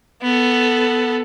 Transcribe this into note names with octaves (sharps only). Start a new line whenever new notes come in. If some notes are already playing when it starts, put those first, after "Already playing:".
B3 A4